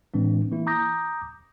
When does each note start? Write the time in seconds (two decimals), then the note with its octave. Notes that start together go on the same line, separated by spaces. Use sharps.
0.14 A2 E3 G#3 C4 D4
0.52 E3 A#3 E4
0.67 A#5 D6 D#6 G6 A#6